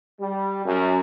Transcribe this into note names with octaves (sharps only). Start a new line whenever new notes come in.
G3
F#2